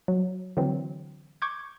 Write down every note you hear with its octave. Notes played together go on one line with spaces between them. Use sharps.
F#3
D3 E3 F#3 C4
C#6 D6 G6 G#6